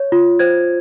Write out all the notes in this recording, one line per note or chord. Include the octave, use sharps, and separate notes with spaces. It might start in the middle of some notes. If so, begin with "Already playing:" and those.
Already playing: C#5
F4
C5 G#6